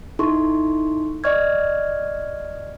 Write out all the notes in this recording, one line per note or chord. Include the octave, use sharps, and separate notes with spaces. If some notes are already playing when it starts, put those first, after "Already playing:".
D#4 E4 A4 C6 C#6
D5 D#5 C#6 F6 G#6